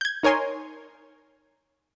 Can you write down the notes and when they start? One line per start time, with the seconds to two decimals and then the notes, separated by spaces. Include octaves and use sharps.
0.01 G6 G#6
0.23 D#4 A#4 C#5 G#5 C6